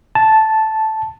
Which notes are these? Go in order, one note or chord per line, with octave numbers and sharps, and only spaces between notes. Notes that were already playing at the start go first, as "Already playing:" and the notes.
A5